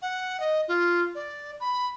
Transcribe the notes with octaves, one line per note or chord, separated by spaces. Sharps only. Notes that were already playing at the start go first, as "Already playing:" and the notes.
F#5
D#5
F4
D5
B5